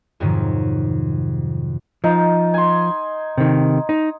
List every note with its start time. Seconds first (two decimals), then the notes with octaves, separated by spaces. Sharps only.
0.20 F2 G#2 C3 D#3 F3 F#3
2.04 F3 D#4
2.54 G#5 C6
3.38 C3 D#3
3.89 D#4